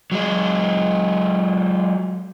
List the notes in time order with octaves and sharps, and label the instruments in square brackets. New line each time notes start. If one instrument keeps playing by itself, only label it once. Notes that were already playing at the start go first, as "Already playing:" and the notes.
[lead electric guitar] F#3 G#3